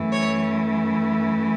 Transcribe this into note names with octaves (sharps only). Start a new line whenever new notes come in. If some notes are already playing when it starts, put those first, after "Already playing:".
Already playing: F#2 E3 A3
C#5